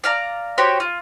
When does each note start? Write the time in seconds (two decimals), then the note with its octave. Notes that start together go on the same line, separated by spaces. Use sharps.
0.04 D5 F5 A#5
0.58 F#4 G4 C5 C#5
0.80 F4